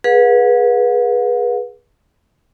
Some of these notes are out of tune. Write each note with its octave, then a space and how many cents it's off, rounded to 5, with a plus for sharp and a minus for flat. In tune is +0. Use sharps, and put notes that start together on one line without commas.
G#4 +0 B4 -25 F#5 -45